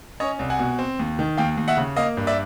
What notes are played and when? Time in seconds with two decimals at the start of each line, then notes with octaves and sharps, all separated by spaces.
0.20 C#4 C#5 D#5
0.39 C2
0.50 F#5 G#5
0.59 B2
0.78 C4
0.99 D#2
1.19 D#3
1.37 D#2 F5 G5
1.57 D#2
1.68 E5 F#5
1.77 C#3
1.96 A#3 D#5 F5
2.17 G2
2.27 D5 E5